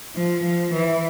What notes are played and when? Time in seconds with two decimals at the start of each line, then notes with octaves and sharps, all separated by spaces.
0.16 F3
0.44 F3
0.74 E3